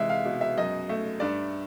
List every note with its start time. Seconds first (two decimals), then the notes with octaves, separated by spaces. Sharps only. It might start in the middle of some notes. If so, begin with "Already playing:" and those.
Already playing: C3 E3 G#3 E5
0.09 F5
0.25 B2
0.41 E5
0.58 F#2 D#5
0.89 A3
1.20 G2 D5